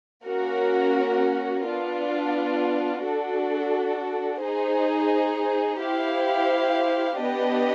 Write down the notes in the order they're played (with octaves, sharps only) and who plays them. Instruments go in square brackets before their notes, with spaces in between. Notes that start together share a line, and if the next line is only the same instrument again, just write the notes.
[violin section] A#3 C#4 F#4 A#4
B3 D4 F4
D4 F#4 A4
D#4 G#4 C5
E4 G4 C5 F5
B3 D4 G4 B4 D#5